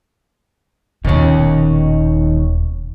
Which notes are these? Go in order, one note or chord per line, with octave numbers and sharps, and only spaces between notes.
D#1 B2 D#3 C#5